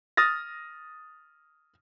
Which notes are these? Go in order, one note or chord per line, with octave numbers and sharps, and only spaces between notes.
D#6 F6 A6 A#6